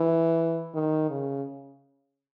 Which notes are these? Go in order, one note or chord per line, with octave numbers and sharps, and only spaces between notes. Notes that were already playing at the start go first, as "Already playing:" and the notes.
Already playing: E3
D#3
C#3